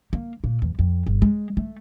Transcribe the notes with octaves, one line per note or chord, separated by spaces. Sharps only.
A#3
A#2
E2
F2
G1
G#3
A3